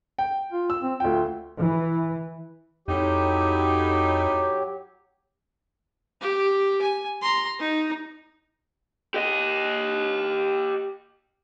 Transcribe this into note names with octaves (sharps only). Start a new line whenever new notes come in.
G5
F4
E6
C4
D2 F4 G5
E3
F2 A2 F#3 D#4 G4
G4
G#5
A#5 C6
D#4
G4 D#5